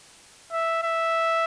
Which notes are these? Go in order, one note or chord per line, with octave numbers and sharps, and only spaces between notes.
E5
E5